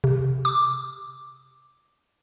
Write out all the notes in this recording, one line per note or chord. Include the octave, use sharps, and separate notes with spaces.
C3
D6